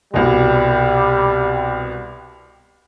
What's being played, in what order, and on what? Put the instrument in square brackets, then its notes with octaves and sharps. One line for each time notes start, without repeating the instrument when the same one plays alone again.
[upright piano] C2 B2 [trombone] G3